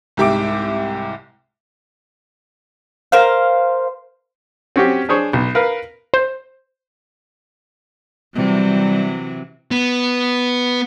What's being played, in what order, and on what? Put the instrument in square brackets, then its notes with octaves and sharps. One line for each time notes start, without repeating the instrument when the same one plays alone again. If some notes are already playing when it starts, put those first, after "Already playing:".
[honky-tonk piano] C2 G#2 G4 E5 D6 D7
[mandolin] A#4 C5 F5
[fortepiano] C4 C#4 F#4 G4
D4 G#4 C5 C#5
B1
A#4 B4 F5
[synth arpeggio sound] C5
[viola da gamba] C3 E3 F#3 [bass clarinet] G3
[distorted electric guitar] B3